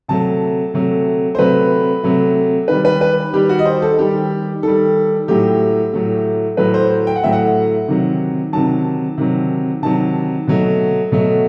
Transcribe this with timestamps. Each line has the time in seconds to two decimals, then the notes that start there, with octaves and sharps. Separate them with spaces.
0.08 C3 F#3 A3 A5
0.74 C3 F#3 A3
1.35 C5
1.38 C3 F#3 A3 B4
2.03 C3 F#3 A3
2.68 D#3 G3 B4
2.85 B4
3.01 B4
3.34 D#3 G3 G4
3.49 F#4
3.59 D#5
3.66 C5
3.82 A4
3.99 D#3 G3 G4
4.63 D#3 G3 A4
5.28 A2 F#3 A3 G4
5.93 A2 F#3 A3
6.57 A2 F#3 A3 B4
6.74 C5
7.07 G5
7.16 F#5
7.23 A2 F#3 A3 E5
7.32 F#5
7.88 C3 D#3 F#3
8.53 C3 D#3 F#3 A5
9.18 C3 D#3 F#3
9.82 C3 D#3 F#3 A5
10.47 B2 F#3 A3
11.12 B2 F#3 A3